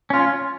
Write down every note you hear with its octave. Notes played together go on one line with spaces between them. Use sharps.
C#4 F4